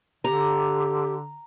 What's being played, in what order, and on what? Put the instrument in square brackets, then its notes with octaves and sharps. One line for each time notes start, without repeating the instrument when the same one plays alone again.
[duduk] D3 [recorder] G4 [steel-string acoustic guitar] A#5